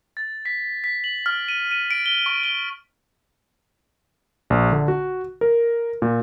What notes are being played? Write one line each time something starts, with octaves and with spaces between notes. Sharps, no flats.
A6
B6
B6
F#7
F6
D#7
D#7
D7
G7
C#6
G7
A#1
D3
F#4
A#4
A#2